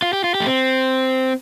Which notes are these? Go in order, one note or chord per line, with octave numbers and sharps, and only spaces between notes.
F4
G4
F4
G4
A3
C4